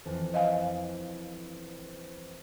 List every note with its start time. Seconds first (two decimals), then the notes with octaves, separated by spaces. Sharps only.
0.06 F2 E3
0.34 D#5 F5 G#5